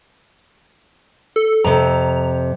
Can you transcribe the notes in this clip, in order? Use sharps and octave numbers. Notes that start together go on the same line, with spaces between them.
A4
F2 C3 A#5